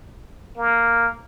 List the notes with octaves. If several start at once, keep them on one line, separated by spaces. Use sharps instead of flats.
A#3